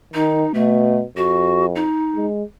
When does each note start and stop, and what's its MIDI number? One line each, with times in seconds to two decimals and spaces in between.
0.14 0.45 51
0.14 0.52 63
0.54 1.04 47
0.54 0.99 57
1.17 1.86 41
1.17 1.66 66
1.76 2.26 63
2.16 2.43 56